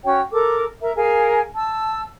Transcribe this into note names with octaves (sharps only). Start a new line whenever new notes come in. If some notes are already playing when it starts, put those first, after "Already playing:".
C#4 F#4 C#5 G5
A4 A#4 D6
A#4 E5 A#5
G#4 A#4 F5 G#5
A5 E6